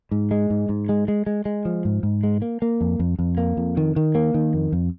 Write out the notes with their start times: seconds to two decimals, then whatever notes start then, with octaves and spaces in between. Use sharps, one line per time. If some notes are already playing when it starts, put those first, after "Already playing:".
0.11 G#2
0.31 G#3
0.50 G#2
0.69 G#2
0.89 G#3
1.08 G#3
1.26 G#3
1.45 G#3
1.65 F3
1.85 G#2
2.03 G#2
2.23 G#3
2.42 A#3
2.62 A#3
2.81 F2
2.99 F2
3.19 F2
3.38 A#3
3.57 F2
3.77 D#3
3.96 D#3
4.15 A#3
4.34 D#3
4.54 F2
4.72 F2